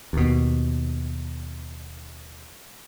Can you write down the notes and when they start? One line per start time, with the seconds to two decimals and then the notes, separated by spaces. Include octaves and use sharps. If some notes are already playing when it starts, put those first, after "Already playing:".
0.13 D#2 B2